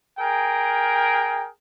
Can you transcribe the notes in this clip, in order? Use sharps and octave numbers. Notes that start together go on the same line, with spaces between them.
G#4 A#4 G5